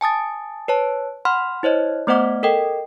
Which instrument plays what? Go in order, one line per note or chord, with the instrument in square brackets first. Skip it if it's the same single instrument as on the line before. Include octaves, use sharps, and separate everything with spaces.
[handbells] G#5 A5 D#6 A6
B4 C#5 A5
F#5 B5 C6 F6
E4 C5 C#5 D#5
A3 B3 C5 D#5 F#5 D6
A4 A#4 D#5 G5